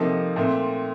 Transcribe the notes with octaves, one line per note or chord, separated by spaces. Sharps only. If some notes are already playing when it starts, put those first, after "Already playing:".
Already playing: C3 F3 A#3 D#4 A4
A#2 A3 C4